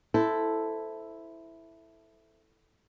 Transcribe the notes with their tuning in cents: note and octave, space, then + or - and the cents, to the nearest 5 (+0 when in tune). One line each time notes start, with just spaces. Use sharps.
E4 +0 A4 +0 C5 -15